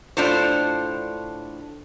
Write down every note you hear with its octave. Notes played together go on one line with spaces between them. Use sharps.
A2 D4 F4 A4 C5